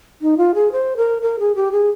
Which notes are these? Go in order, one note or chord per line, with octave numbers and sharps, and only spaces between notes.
D#4
F4
G#4
C5
A#4
A#4
G#4
G4
G#4